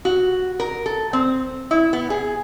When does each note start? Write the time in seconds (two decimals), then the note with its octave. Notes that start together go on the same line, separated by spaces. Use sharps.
0.05 F#4
0.60 A#4
0.86 A4
1.13 C4
1.71 E4
1.93 B3
2.10 G#4